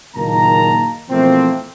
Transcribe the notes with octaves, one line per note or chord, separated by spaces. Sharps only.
F#1 A#2 D#3 A#3 A5 A#5
B2 E3 F3 A3 A#3 C4